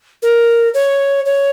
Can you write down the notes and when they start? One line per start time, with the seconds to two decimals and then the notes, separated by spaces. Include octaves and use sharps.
0.22 A#4
0.74 C#5
1.26 C#5